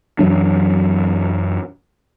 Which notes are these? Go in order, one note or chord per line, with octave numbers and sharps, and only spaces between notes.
F#2 E3 F#3 D4